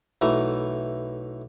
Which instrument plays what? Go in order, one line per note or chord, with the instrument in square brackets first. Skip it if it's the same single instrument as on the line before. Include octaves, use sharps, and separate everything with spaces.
[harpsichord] B1 E3 A3 A#5